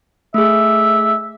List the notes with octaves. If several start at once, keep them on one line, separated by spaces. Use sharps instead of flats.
A3 G#4 E5